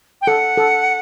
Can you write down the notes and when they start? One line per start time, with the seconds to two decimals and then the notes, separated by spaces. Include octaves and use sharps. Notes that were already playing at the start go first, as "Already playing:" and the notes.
0.22 G5
0.27 A4 F#5
0.57 A4